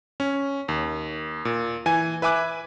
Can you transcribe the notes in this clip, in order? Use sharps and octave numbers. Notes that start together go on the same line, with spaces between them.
C#4
D#2
A#2
E3 G#5 G#6
B4 E5 G#5 D6 F#6